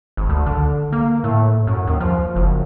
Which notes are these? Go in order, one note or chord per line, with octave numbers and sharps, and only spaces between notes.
G#1
D2
D3
A#3
A2
F#2
D#2
F3
F#1